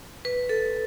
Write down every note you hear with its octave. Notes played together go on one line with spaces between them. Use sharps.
B4
A4